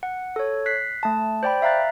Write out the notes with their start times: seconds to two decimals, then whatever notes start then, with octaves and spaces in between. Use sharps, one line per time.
0.03 F#5
0.36 A4 C#5
0.66 F#6 B6 C7
1.03 A3 A5
1.43 C5 D5 G5 B5
1.62 E5 F5 A#5 F#6 A6